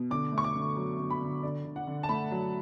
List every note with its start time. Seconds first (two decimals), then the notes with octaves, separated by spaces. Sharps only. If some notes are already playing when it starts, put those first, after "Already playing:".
Already playing: B2
0.11 D3 D6
0.32 A3
0.38 C#6
0.44 D6
0.55 D3
0.77 F#3
0.98 D3
1.10 B5
1.21 D3
1.43 D3 D5
1.65 D3
1.76 F#5
1.87 D3
2.03 A5
2.09 A3 B5
2.32 F#3